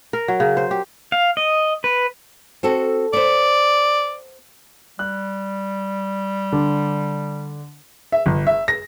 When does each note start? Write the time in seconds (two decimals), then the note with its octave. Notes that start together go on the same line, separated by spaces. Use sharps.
0.13 A#4
0.28 F#3
0.40 C#3
0.57 C5
0.71 G4
1.12 F5
1.37 D#5
1.84 B4
2.63 C4 F#4 A4
3.13 B3 C5 D5
4.99 G3 F#6
6.52 D3 D4
8.12 E5
8.26 G1
8.47 E5
8.68 A#6